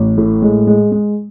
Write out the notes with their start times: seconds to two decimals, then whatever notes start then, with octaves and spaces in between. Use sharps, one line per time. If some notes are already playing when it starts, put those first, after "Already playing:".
Already playing: A1
0.17 A2
0.42 G#3
0.67 G#3
0.92 G#3